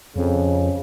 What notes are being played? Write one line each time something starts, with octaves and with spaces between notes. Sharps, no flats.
F2 C#3